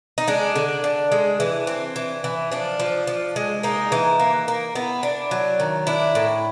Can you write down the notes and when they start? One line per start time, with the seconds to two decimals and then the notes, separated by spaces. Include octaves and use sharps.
0.18 D#4
0.28 G#3 D4
0.56 D3
0.84 D3
1.12 G#3
1.40 E3
1.67 C4
1.96 E3
2.24 E3
2.52 F3 D4
2.80 F3
3.07 F3
3.36 G#3
3.63 A#3 D#4
3.92 E3
4.20 A#3
4.48 A#3
4.75 B3 E4
5.03 D4
5.31 F#3
5.60 D#3
5.87 D4 E4
6.15 A2